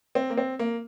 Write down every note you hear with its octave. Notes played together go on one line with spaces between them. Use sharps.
C4
A#3
C4
A#3